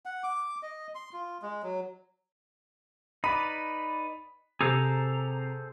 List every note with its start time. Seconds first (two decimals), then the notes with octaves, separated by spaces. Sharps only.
0.06 F#5
0.24 D6
0.63 D#5
0.95 C6
1.13 F4
1.43 G#3
1.63 F#3
3.24 D#4 B4 D5 B5
4.61 C3 G#4 A4 C5 A#5